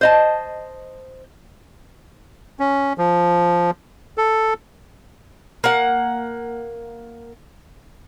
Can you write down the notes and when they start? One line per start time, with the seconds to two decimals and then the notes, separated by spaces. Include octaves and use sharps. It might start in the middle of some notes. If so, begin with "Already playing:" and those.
0.01 C5 D#5 A5
2.59 C#4
2.98 F3
4.18 A4
5.64 A#3 F#5